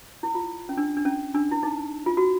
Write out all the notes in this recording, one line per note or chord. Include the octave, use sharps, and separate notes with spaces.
E4
F4
C#4
D4
D4
C#4
D4
E4
D#4
F4
F#4